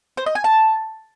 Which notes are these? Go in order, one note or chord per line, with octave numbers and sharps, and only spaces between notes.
C5
D#5
G#5
A5